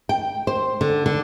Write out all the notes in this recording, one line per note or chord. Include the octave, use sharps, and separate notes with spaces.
G5
C5
D3
D3